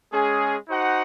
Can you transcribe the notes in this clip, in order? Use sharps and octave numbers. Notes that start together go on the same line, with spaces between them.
G#3 C#4 G#4
D#4 F#4 C5 F#5